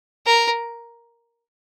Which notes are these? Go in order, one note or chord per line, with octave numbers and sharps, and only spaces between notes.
A#4